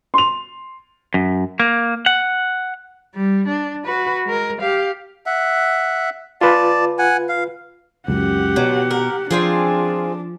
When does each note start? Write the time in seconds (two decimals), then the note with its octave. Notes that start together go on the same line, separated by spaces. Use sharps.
0.14 C6 F7
1.14 F#2
1.60 A#3
2.06 F#5
3.15 G3
3.48 D4
3.85 F#4 B4
4.26 G#3 A#4
4.61 G4 F5
5.26 E5 F#5
6.41 F4 B4 D5 A5
6.99 F#5 G#5
7.29 F5
8.08 C#2 F#2 G4 F#5
8.56 B2 F#3
8.91 A#4
9.31 F3 C4 D4 F4 G#4